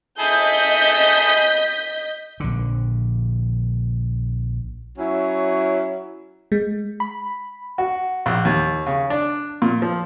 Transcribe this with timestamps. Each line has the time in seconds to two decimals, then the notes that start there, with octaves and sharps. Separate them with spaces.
0.19 E4 G#4 A4 D#5 G6 B6
2.40 A#1 D3
4.98 F#3 C#4 E4
6.52 G#3
7.00 B5
7.78 F#4
8.26 A#1
8.45 D#2
8.87 C#3
9.10 D4
9.62 A#2
9.82 F3